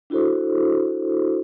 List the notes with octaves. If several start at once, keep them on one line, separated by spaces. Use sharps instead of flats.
D4 E4 F#4 A4 C5